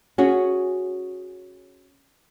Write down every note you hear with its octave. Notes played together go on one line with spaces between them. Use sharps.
C#4 F#4 G#4